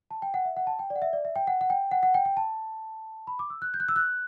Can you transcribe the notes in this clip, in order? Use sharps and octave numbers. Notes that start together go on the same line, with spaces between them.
A5
G5
F#5
E5
F#5
A5
G5
D5
F#5
E5
D5
E5
G5
F#5
F#5
G5
F#5
F#5
G5
G5
A5
B5
D6
E6
F#6
G6
F#6
E6
F#6